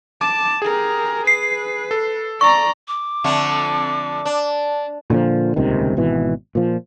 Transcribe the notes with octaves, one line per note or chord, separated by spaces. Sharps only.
A5 D6
G4 G#4 A#4
B4 C7
A4
D5 A#5 C#6
D6
F2 D3 A3
D4
A#2 D3 D#3 F3
D#1 C#2 C3 D#3
G#1 B2 E3
A#2 F3